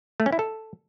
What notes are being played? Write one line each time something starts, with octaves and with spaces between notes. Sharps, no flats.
A3
C#4
E4
A4